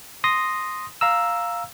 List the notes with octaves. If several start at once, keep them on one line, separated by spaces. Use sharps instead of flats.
C6 D#6 A#6
F5 A#5 E6